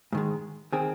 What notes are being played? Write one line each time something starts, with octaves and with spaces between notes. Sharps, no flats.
G#2 D#3 G#3
D#3 C4 G#4